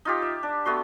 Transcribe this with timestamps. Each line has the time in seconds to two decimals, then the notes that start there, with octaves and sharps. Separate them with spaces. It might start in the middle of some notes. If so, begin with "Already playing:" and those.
0.05 D#4 F4 G4
0.22 E5
0.43 D4
0.65 A3 B3 F#4 C6